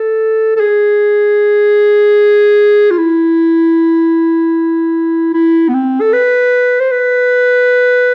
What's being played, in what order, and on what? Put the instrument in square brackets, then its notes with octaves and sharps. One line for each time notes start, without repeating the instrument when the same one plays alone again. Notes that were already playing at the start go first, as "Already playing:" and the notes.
Already playing: [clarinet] A4
A4
G#4
F4
E4
E4
B3
C4
A4
B4
C5
B4